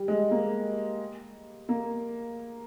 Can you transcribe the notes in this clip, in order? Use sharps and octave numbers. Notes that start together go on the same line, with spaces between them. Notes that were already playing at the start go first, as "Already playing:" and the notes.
Already playing: G3
G#3
A#3
A#3